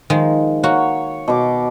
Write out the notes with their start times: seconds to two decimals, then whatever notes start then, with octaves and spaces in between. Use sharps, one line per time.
0.10 D#3 F3 G#3
0.63 A#3 F#4 C#5
1.28 B2 D6